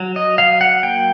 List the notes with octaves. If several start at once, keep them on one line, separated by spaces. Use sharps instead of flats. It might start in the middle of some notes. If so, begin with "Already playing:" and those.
Already playing: F#3
D#5
F#3 F5
F#5
A#3 G5